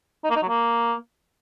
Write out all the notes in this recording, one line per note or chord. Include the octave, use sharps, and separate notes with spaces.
D#4
A#3
D#4
F#3
A#3